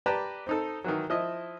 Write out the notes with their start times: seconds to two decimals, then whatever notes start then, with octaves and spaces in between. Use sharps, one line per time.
0.06 G4 B4 D5 A5 A#5
0.47 C4 D#4 A4
0.84 D#3 E3 F#3
1.10 F3 E4 D#5